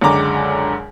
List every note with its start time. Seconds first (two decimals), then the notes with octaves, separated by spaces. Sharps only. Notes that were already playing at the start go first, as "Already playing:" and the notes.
0.01 C#2 F#2 D3 G#3 A#5 D6